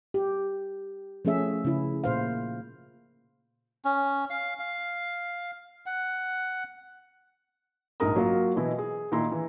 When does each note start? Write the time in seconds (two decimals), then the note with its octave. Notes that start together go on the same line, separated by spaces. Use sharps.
0.14 G4
1.25 F3 A3 C#4 G#4 E5
1.65 C#3 E4
2.04 A#2 C5 F5
3.85 C#4
4.30 F5
4.59 F5
5.86 F#5
8.00 A#1 G#2 D#4 A#4 A#5 D#6
8.16 F#3 A#3 F4
8.56 B2 E3 E4 D#5
8.79 G#4
9.12 A#2 D#3 E4 A#5 C6
9.32 E3